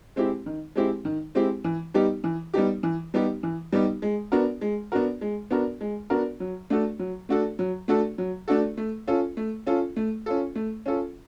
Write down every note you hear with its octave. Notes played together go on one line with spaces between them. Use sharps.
G#3 C4 E4 G4
D#3
G#3 C4 E4 G4
D#3
G#3 C4 E4 G4
E3
G3 B3 D#4 G4
E3
G3 B3 D#4 G4
E3
G3 B3 D#4 G4
E3
G3 B3 D#4 G4
G#3
B3 D4 F#4 A#4
G#3
B3 D4 F#4 A#4
G#3
B3 D4 F#4 A#4
G#3
B3 D4 F#4 A#4
F#3
A3 D4 F#4 A4
F#3
A3 D4 F#4 A4
F#3
A3 D4 F#4 A4
F#3
A3 D4 F#4 A4
A3
C#4 F4 A4
A3
C#4 F4 A4
A3
C#4 F4 A4
A3
C#4 F4 A4